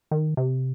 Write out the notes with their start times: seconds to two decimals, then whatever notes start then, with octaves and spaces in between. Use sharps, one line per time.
0.11 D#3
0.37 C3